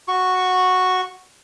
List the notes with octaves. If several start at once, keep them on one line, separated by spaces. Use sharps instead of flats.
F#4 C#6